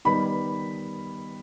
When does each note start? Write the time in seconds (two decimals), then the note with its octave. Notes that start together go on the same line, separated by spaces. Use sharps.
0.05 D#3 G3 B3 D#4 B5